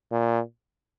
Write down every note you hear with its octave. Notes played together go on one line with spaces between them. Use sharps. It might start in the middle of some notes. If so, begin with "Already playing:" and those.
A#2